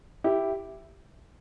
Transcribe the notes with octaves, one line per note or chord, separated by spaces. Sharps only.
E4 G4